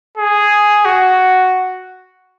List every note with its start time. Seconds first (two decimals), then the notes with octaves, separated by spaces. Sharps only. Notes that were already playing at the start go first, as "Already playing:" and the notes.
0.18 G#4
0.85 F#4